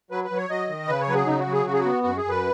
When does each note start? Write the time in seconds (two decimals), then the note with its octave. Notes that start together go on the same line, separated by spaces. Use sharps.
0.11 F#3 B4
0.24 B4
0.31 F#3
0.37 C#5
0.49 F#3 D#5
0.69 D#3
0.88 C#3 B4
1.01 C#5
1.08 F#3 B4
1.14 G#4
1.26 C#3 D#4
1.39 F#4
1.47 F#3
1.53 G#4
1.66 C#3 F#4
1.73 G#4
1.79 F#4
1.85 B3
2.03 F#2 F#4
2.17 G#4
2.24 F#2
2.30 B4